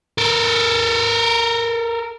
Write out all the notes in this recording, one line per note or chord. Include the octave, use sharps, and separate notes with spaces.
A4 A#4